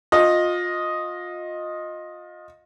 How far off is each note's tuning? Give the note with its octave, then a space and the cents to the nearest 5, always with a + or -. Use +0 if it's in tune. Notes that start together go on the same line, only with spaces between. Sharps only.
F4 +25 D#5 +0